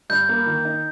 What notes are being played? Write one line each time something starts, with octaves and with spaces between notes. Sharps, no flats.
G2 G6
A#3
D#3
D#4